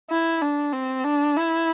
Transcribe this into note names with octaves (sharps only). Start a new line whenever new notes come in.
E4
D4
C4
D4
E4